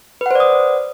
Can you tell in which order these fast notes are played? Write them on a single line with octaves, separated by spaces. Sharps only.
B4 F#5 C5 D5 D#6